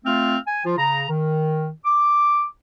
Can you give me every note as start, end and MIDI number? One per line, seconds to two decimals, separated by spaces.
0.05 0.36 57
0.05 0.36 60
0.05 0.36 65
0.05 0.36 77
0.05 0.36 89
0.46 0.61 80
0.65 0.75 53
0.65 0.75 65
0.77 1.03 49
0.77 1.03 82
1.09 1.69 51
1.85 2.45 86